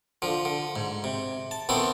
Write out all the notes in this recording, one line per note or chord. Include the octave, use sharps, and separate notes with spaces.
D3 F3
D3
G#2
C3
A5
D#3 E3 B3 C4 A4